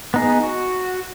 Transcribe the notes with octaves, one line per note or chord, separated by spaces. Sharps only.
B3 D#4 G#4
F#4